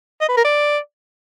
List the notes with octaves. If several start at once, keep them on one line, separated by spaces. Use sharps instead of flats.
D#5
B4
A#4
D5